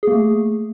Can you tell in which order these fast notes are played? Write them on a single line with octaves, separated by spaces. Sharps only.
G#4 A#3 A3